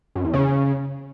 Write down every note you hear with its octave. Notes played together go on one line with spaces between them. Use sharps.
F#2
E2
C#3